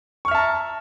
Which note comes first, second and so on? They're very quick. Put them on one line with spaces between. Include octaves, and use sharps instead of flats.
C#6 F6 E5 A5 A#5